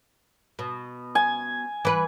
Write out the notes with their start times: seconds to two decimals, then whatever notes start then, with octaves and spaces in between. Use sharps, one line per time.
0.59 B2
1.15 G#5
1.85 E3 B4